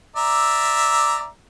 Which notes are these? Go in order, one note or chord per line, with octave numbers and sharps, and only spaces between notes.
D5 E5 A#5